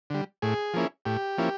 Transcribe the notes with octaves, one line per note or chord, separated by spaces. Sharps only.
D3 G3
A2 G#4
F3 A#3 C#4 E4
A2 G4
F3 A#3 C#4 E4